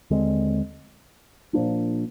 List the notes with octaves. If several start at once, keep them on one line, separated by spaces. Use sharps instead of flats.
D#2 D3 G#3 C4
A#2 F3 A#3 D4